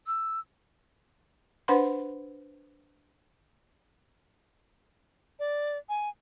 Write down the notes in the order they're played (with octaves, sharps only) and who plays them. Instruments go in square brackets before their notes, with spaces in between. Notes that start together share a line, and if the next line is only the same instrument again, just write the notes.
[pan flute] E6
[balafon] D4 B4 C5 F#5 B5 C6
[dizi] D5
G#5